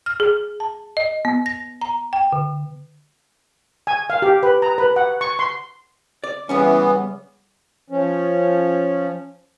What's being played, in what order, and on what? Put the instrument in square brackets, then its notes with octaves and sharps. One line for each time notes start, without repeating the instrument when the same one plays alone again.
[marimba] F6
G#4
A5
D#5
B3
A#6
A#5
G5
D3
[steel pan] G#5
F5
G4
B4
A#5
B4
F#5
C#6
C6
[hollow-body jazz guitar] D5
[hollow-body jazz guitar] C#3 G3 C#4 [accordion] E3 B3
[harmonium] F3 C#4